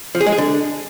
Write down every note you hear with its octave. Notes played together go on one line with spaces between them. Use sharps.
F3
G#4
G#3
G#4
D3